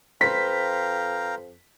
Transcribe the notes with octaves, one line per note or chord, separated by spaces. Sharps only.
F2 B4 C5 F5 G5 A#5 B6